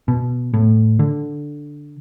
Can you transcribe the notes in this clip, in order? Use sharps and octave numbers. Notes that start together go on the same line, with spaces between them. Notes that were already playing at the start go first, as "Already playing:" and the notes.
B2
A2
D3